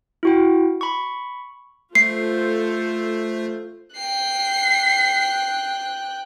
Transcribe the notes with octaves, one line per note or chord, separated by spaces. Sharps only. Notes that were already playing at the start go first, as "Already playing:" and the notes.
E4 F#4 G5
B5 C#6
A3 F4 A4 C5 C7
G5 F#6 C7